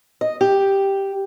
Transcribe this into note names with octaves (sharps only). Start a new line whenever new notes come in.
D#5
G4